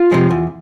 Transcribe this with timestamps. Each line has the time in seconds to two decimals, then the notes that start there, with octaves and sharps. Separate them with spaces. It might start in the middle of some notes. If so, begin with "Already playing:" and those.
Already playing: F4
0.11 C3 F3 G#3
0.31 E2